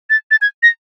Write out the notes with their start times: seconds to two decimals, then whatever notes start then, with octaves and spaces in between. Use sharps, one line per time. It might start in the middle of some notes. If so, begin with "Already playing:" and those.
0.10 A6
0.31 A6
0.41 G#6
0.63 A#6